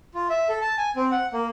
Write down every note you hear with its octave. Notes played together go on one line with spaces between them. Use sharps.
F4
E5
A4
A5
G#5
C4
F#5
A#3